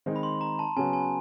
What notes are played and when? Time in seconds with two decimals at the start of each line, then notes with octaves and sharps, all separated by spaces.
0.06 D#3 G#3 C4 D#4
0.16 B5
0.23 C6
0.41 A#5
0.59 A5
0.76 C#3 F#3 B3 G#5
0.93 G#5